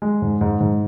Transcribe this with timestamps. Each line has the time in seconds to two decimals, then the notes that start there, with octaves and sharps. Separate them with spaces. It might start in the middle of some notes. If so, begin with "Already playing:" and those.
0.02 G#3
0.22 G#2
0.41 G#2
0.60 G#2